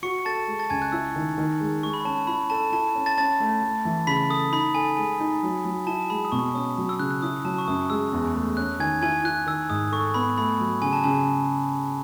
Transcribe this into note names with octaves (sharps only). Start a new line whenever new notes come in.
F#4 C#6 C#7
A4 A5 A6
G#3
A5 A6
C#2 G#5 G#6
F#6
E4 E6
D#3
D#3
G#3
G#3 C#6
B5
C#4 A5
E4 B5
A4 A5
E4 A5
C#4
A5 A6
C#4 A5 A6
A3
A3
E3
C#3 B5 B6
A4 D#6
D#4 B5
A4 G#5
G#3 G#5
D#4
F#3
F#3
E4 A5
G#3 B5
D#6
B2 C#6
C#4 D#6
F#3
E6
C#3 F#6
F#6
E4 D#6
F#3 A5
C#6
F#2 D#6
G#3 E6
E2
A3
C#4 F#6
D#3 G#5 G#6
E4 G#5 G#6
E4 F#6
D#3 E6
G#2 D#6
A4 C#6
B3 B5
A3 B5
F#3
C#3 G#5
A5
C#3 G#5